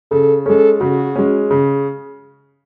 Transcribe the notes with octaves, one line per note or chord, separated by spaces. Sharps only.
C#3 A4
G#3 C#4 A4
C#3 F#4
G#3 C#4
C#3